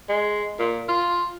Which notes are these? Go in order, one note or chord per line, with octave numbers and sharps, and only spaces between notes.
G#3
A#2
F4